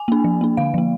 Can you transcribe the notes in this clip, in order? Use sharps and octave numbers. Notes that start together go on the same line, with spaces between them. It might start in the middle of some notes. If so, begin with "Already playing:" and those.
Already playing: G#5
A#3 D4
F3
A#3 D4
D3 F5
F3 A#3